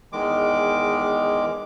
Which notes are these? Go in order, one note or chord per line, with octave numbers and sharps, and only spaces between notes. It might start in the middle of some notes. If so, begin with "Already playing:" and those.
E2 D#3 G#3 D6